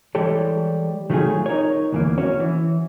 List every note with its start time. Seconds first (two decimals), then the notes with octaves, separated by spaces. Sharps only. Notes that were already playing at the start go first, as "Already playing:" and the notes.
0.15 E3 G3 G#3 G4 A4 C#5
1.10 D#3 F#3 A3 E4 F4 G#4
1.46 D#4 A#4 C#5
1.92 D2 E3 A#3
2.18 C#4 E4 F#4 C#5
2.40 E3